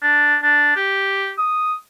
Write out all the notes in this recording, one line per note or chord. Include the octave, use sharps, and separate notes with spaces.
D4
D4
G4
D#6